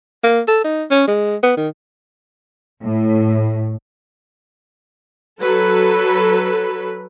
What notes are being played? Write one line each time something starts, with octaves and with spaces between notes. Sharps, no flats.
A#3
A4
D#4
C#4
G#3
B3
D#3
A2
F#3 A4 B4